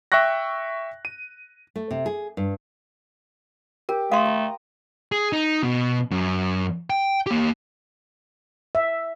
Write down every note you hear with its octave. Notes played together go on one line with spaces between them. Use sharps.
E5 G5 C#6 F#6 A#6
D#7
A3
C3
G#4
G2
G4 A#4
A3 F5 C6 D#6
A#5
G#4
D#4
B2
F#2
G5
A#3 G4
E5